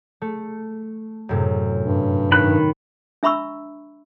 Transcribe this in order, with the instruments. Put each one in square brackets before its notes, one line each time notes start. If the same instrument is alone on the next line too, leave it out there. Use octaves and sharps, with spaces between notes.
[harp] A3
F#2 A2 C3
[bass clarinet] G2
[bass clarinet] G2 [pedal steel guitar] D#3 B5 F#6
[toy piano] D4 E5 A#5 B5 C#6 E6